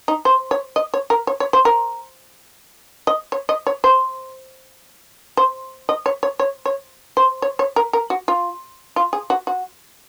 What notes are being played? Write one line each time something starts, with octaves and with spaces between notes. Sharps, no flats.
D#4
C5
C#5
D#5
C#5
A#4
C#5
C#5
C5
A#4
D#5
C#5
D#5
C#5
C5
C5
D#5
C#5
C#5
C#5
C#5
C5
C#5
C#5
A#4
A#4
F#4
F4
F4
G#4
F#4
F#4